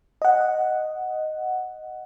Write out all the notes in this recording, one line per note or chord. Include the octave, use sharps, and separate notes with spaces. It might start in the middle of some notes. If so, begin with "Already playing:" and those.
D#5 F#5